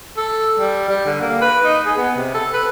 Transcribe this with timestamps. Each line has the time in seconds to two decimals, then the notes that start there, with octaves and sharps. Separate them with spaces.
0.17 A4
0.59 G3
0.89 G3
1.06 D3
1.21 A#3
1.42 B4
1.65 D#4
1.86 G#4
1.98 B3
2.16 C3
2.34 A4
2.53 B4